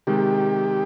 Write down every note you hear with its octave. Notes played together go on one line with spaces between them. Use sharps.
C3 D#3 G#3 G4